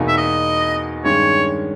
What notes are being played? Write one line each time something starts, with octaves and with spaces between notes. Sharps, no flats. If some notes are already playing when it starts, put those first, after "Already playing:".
Already playing: E2 B2 A#3 D#4
E5
D#5
G2 D#3 G#3 C#4 C#5